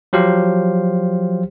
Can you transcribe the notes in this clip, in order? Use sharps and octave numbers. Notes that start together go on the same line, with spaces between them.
F3 F#3 G4 C5 F5